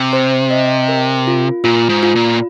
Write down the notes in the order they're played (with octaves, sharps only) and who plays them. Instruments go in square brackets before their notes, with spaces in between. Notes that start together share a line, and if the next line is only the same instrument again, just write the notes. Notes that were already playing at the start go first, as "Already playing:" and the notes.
Already playing: [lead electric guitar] C3
[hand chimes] C5
D#5
A#4
F4
[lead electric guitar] A#2 [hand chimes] F4
[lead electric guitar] G#2
[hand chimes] F4
[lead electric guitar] A#2